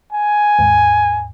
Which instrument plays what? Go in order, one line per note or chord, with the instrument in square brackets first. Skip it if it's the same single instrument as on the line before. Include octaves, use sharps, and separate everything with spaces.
[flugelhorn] G#5
[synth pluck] D#2 G#2